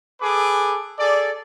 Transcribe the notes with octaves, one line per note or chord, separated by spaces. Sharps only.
G#4 A4 B4 D6
G#4 A4 D5